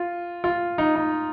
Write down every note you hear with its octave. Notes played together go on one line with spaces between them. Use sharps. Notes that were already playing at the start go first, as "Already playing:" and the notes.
Already playing: F4
F4
D#4
D#4